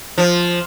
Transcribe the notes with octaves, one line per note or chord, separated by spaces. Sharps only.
F3